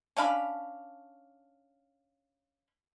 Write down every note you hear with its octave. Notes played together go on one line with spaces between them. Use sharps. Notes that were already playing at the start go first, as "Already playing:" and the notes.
C#4 D4 F5 B5